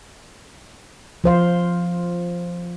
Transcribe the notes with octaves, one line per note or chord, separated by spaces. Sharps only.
F3 C5 F5